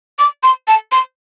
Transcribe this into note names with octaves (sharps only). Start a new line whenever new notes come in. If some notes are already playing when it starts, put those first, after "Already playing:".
D6
C6
A5
C6